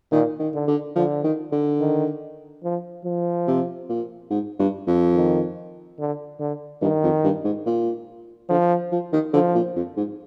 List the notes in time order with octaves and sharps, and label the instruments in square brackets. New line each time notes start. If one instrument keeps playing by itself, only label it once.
[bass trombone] A#2 [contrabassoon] D#3
[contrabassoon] D#3
[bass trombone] D3
[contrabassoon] D3
[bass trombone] D3 [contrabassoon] F3
[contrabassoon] D#3
D3
[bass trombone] D#3
F3
F3
[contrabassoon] C3
A#2
G#2
G2
F2
[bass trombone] D#3
D3
D3
[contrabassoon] G2 [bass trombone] D#3
[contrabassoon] F2
G2
G#2
A#2
[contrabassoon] D3 [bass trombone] F3
[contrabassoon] F3
D#3
[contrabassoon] D3 [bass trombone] F3
[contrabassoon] A#2
F2
G#2